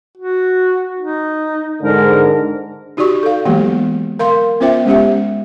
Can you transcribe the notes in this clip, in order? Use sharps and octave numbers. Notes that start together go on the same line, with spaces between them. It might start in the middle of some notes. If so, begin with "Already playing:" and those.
F#4
D#4
G#2 D3 A#4
D#4 F#4 G4 D5 C#6
A4 F5
E3 F#3 G#3 A#3 B3 G4
A#4 F5 C6
B3 C#4 F4 C5 E5 G5
G#3 C#4 G4 E5